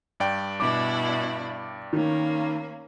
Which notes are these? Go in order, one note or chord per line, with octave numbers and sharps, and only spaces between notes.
G2 D5 G5
B2 D4 E4 D6
D#3 A#3 C#4